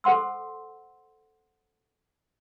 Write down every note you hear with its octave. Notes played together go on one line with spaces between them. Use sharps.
A4 C5 F#5 C6 E6